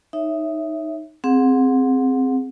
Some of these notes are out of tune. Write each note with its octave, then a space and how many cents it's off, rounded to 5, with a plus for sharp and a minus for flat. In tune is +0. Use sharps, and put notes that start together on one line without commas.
D#4 +0 C#5 +0 E5 +0
C4 +0 G#4 +0 F#5 -30